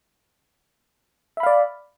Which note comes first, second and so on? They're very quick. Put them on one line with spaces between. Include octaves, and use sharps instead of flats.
E5 B5 F5 D5